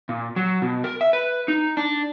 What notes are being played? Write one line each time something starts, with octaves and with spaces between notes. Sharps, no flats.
A#2
F#3
B2
A#4
E5
B4
D#4
D4